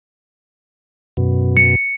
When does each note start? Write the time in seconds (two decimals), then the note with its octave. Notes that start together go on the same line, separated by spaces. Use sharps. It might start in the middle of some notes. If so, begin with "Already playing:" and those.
1.17 F#2 B2
1.57 C#7